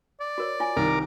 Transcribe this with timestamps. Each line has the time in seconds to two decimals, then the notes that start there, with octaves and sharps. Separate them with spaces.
0.20 D5
0.38 F#4 A#4 C#5
0.60 F4 G#5
0.77 C2 D#3 A#4 D6